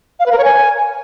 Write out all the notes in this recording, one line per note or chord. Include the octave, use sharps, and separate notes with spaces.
F5
B4
A#4
C#5
G#5